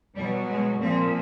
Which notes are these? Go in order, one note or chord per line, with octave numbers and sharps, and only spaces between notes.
B2 F#3 G3
G#3
A#2 F3 C4